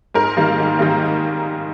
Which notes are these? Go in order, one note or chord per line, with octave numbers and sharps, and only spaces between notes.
G#2 A#4
D#3 G3 A#3
G#2
D#3 G3 A#3